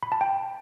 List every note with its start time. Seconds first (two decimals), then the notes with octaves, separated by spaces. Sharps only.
0.03 B5
0.12 A5
0.21 G5